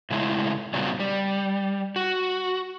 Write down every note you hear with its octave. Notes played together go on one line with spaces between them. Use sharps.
A2 C#3 G#3 A3 E4
A#2 C#3 F#3 G3 B3 C4
G3
F#4